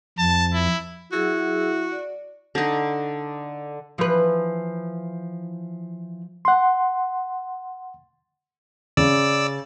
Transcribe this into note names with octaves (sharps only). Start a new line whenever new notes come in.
F2 A5
E4
F#3 E4 F#4 G#4 E6
D5
D3 D#4
E3 F3 B4
F#5 C6
C#3 D5 E6